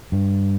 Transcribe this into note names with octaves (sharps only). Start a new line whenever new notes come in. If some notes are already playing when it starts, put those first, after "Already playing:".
G2